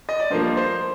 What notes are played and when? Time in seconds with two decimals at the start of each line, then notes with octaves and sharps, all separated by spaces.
0.09 D#5
0.20 D5
0.30 G2 F3 A#3 C5
0.57 C5